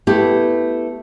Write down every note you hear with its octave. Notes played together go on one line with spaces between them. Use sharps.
A3 B3 E4 G4